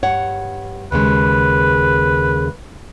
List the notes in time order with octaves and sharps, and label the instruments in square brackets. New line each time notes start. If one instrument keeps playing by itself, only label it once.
[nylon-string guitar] G2 C#5 F#5
[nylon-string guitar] D#2 C#3 G#3 [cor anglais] B4